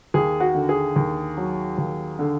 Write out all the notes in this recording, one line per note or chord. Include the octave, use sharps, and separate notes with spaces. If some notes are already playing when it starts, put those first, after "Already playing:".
D#2 G#4
F#4
D3
G#4
D#2
F#3
D#2
D3